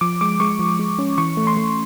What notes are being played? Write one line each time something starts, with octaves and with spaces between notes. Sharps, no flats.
F3 D6
G#3 D6
G#3 C#6
F3
G#3
C#4
E3 C#6
A3
C6
A3